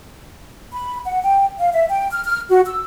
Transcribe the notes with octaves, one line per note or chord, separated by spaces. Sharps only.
B5
F#5
G5
F5
E5
G5
F6
F6
F#4
E6